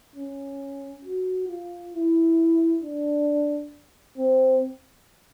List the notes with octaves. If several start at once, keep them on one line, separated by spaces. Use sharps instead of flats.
C#4
F#4
F4
E4
D4
C4